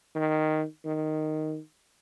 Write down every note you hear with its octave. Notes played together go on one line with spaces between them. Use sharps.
D#3
D#3